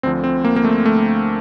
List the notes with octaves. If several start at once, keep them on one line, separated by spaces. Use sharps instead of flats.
D2 D3 F3 C4
C4
A#3
A#3
A3
A3